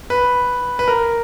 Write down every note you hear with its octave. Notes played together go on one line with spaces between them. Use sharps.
B4
B4
A#4